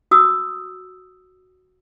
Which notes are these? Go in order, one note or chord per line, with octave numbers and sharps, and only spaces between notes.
F#4 D#6 E6